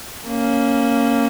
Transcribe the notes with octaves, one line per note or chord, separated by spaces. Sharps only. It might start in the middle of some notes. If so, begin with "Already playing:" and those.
A#3 C#4